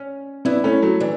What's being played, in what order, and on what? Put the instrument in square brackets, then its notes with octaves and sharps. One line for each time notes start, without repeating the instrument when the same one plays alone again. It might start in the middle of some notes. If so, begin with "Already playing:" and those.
Already playing: [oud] C#4
[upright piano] B3 D4 [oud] E4
[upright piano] A3 C#4
F#3 A3
[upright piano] E3 [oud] D4